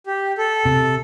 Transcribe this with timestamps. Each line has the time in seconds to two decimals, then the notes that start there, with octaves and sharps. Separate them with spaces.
0.06 G4
0.38 A4
0.65 C3